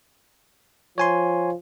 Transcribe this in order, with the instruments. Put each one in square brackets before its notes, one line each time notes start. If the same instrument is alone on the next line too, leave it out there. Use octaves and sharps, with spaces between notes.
[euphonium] F3 [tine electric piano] C#5 G#5 C6